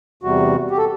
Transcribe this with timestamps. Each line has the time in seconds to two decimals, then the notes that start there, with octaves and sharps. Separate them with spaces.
0.23 E2 C3 G3 F#4
0.70 G4
0.78 A4